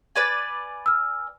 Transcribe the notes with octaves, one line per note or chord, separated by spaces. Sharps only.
B4 D5 G#5
E6 F6